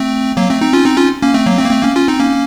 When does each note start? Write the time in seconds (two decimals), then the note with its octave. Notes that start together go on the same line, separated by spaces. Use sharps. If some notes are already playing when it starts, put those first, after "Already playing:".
Already playing: A3 C4
0.37 F#3 A#3
0.50 A3 C4
0.61 C4 D#4
0.73 C#4 F4
0.86 C4 D#4
0.97 C#4 F4
1.22 A#3 C#4
1.34 A3 C4
1.47 F#3 A#3
1.58 A3 C4
1.65 A#3
1.71 A3 C4
1.83 A#3 C#4
1.96 C#4 F4
2.08 C4 D#4
2.19 A#3 C#4